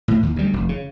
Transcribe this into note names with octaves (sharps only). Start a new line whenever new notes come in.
A2
D#2
D2 G3
F1
C#3